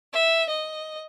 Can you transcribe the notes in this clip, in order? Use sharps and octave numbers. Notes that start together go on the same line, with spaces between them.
E5
D#5